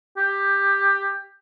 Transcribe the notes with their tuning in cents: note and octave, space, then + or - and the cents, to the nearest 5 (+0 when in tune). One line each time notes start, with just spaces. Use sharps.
G4 +10